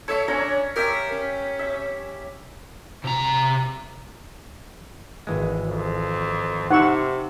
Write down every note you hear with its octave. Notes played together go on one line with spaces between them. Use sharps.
A4 C#5 E5
C#4 D4 C#5 A#5
G4 A#4 E5
C#4
E5
C3 A#5
G#1 E3 G#3
F2
C3 D#4 F#5 B5 C#6 E6